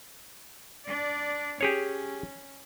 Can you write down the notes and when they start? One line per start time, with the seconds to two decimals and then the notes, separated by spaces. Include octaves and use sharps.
0.86 D4 D5
1.61 C#4 G4 G#4 C#5